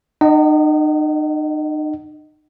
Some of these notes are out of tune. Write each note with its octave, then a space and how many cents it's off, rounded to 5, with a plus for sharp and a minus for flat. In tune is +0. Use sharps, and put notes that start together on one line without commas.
D#4 -40 D#5 +0 F#5 +45